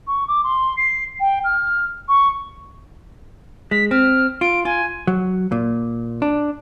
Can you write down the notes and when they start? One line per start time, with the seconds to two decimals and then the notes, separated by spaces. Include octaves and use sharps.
0.07 C#6
0.28 D6
0.44 C6
0.77 C7
1.20 G5
1.44 F6
2.08 C#6
3.71 G#3 B6
3.91 C4 F6
4.41 F4 D7
4.65 F4 G#5
5.07 F#3
5.52 A#2
6.22 D4